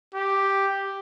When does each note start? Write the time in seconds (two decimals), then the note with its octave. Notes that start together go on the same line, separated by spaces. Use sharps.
0.15 G4